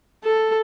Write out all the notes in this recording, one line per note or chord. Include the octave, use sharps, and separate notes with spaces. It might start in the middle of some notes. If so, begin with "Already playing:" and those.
A4